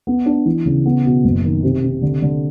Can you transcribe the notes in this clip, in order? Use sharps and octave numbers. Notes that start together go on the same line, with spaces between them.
B3
D4
E3
C#3
B3
B2
F#1
D#3
C3
C3
D3
D3